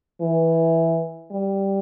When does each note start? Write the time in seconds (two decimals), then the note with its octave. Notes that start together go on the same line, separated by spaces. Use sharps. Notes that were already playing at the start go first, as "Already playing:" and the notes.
0.21 E3
1.31 G3